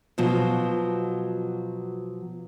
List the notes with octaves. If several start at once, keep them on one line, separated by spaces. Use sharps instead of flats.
B2 F3 F#3